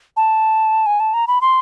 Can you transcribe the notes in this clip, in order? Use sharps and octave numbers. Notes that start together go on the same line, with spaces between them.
A5
G#5
A5
A#5
B5
C6